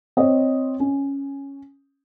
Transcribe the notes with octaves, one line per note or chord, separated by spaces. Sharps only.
C4 C5 C#5 D#5
C#4